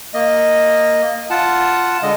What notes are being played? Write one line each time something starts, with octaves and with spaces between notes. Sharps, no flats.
A#3 D#5
F4 F#5 A5
D3 G#3 D#5